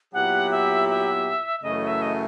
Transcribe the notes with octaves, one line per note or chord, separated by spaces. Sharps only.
A#2 F#3 B3 E4 G4 F#5
E5
E5
F#2 C#3 E3 A3 D#5
E5
D#5